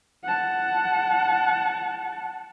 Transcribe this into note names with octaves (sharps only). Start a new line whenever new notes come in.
F#5 A5